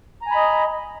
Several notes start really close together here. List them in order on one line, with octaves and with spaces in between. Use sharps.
A#5 G#5 B5 D#5